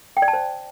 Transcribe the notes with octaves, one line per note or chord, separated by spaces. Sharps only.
G5
D5
A5
C5